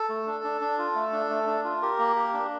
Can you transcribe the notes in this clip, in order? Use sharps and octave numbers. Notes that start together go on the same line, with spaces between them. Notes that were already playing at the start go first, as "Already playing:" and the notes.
Already playing: A4
A3
D4
D4
D4
F4
A3
D4
A3
D4
F4
G4 A#4
A#3
G4
D4